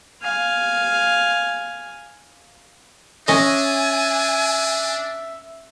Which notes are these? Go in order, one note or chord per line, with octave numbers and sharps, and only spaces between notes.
F5 G#5
C#4 D4 D#5 E5 G#5